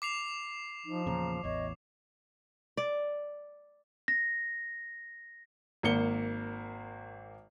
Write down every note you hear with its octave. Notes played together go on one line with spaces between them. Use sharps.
D6 C7 F7
F3 D#4
E2 A#2 C#3 A#5
A1 E2 C#5 D#5
D5
A#6
G#1 A#3 C#7 G7